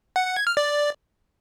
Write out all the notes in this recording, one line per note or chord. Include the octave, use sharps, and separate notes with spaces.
F#5
F#5
G#6
F6
D5